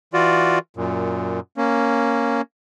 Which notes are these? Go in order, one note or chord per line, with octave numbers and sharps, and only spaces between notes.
E3 F4 F#4 D5
F#2 A#2
A#3 C#4